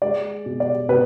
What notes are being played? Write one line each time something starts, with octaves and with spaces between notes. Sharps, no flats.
G#3 D5
B2
D5
B2 B4